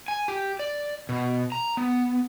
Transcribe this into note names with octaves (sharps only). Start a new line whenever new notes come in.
G#5
G4
D5
B2
A#5
B3